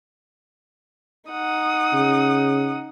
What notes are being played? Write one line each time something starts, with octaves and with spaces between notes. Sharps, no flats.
D#4 F#5 D#6
C#3